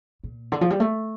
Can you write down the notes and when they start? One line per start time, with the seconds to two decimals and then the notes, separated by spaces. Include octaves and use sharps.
0.24 A#2
0.52 D3
0.61 F3
0.70 G3
0.80 A3